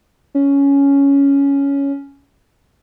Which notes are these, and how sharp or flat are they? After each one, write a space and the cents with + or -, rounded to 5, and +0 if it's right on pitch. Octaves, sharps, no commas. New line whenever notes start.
C#4 +10